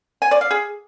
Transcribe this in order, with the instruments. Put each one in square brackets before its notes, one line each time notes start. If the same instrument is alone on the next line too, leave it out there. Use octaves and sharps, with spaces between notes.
[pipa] G#5
D5
F5
G#4